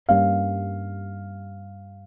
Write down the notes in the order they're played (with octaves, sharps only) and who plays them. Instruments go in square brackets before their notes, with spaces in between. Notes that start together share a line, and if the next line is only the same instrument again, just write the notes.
[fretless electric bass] G2 G3 A#3 C#4 [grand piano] F5